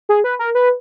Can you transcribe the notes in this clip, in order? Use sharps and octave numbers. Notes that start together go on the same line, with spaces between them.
G#4
B4
A#4
B4